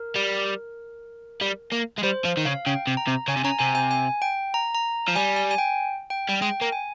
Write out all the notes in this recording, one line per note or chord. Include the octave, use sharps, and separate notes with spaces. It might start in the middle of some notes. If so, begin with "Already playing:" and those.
Already playing: A#4
G3
G3
A#3
G#3
G3 C5
F3
D#3
C#3 F5
C#3 G5
C3
A#5
C3
C#3 G#5
C3
C#3 A#5
C3 G#5
G#5
G#5
G5
A#5
A#5
F3
G3 G#5
G#5
G#5
G5
G5
G3
G#3 G5
A#3
G#5